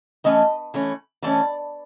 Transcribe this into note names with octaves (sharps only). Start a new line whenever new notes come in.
E3 A3 C#4 D#5
E3 A3 C#4
E3 A3 C#4 D5